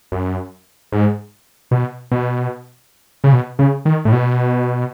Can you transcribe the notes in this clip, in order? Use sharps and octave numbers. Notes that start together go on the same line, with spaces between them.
F#2
G#2
B2
B2
C#3
B2
C#3
D#3
A2
B2